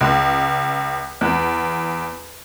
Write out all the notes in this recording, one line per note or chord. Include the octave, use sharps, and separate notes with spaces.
C#2
E2